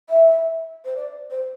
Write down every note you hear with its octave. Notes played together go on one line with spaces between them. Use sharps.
E5
C5
D5
C5